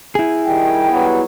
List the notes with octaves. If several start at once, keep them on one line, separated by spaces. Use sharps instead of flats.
E4 G#4
D#3 G3 G5
F#3 G3 B3